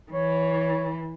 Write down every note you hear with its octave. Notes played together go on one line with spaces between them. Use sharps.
E3 C#5